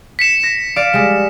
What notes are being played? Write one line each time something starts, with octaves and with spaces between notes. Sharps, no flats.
B6 C#7 E7
A#6
D5 F5 D7
G3 G#3